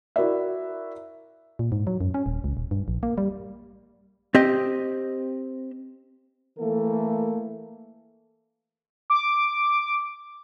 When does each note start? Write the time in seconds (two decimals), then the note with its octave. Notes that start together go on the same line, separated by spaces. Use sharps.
0.16 E4 F#4 A#4 D5 E5
1.59 A#2
1.72 G#2
1.87 F#3
2.01 F#2
2.14 C#4
2.26 D#1
2.44 C#2
2.57 D#1
2.71 G2
2.88 A#1
3.03 A#3
3.18 G3
4.35 C4 G4 D#5
6.59 E3 A3 A#3 A4
9.10 D6